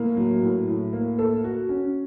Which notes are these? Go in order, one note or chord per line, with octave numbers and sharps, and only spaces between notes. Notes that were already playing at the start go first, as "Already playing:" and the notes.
Already playing: A2 A#3
F#3
A2
A2
A#3
A4
F#4
C#4